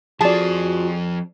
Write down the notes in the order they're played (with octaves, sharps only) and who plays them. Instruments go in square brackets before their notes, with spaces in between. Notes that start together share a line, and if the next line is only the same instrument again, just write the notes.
[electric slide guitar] F3 C4 [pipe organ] F4 F#4 [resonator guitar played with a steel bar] G#4 [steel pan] D5 A5